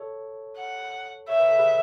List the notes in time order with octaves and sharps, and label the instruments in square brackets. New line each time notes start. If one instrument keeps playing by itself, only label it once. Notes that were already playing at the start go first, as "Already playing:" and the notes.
Already playing: [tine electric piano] A4 C#5
[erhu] F#5
[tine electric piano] C#5 [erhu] E5
[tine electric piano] B4
A4
G#4 B4